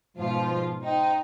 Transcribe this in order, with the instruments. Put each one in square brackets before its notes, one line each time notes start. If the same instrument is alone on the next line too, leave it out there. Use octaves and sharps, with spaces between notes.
[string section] G#2 B2 F4 [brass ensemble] F3
[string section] D#4 [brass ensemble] C5 D#5 G5